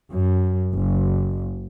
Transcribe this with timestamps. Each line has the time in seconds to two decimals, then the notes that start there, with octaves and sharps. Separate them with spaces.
0.12 F#2
0.74 F#1